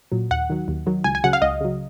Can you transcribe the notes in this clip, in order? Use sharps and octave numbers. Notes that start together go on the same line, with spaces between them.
A#2 F#3
D#2 F#5
D#3 F#3
D#2
D#3 F#3
C#2 G#5
G#5
C#3 F#3 F#5
F5
C#2 D#5
C#3 F#3